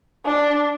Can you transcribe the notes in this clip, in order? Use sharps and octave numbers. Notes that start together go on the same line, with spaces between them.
D4